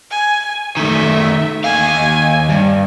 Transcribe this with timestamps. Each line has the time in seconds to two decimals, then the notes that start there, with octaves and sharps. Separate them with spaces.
0.11 G#5
0.77 D#3 A3 E5
1.64 D#2 F5 G#5
2.50 G2